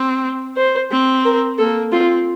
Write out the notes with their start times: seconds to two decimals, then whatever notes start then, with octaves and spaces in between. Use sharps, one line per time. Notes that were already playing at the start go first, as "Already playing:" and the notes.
Already playing: C4
0.57 C5
0.91 C4
1.25 A#4
1.58 A#3 A4
1.92 C4 F4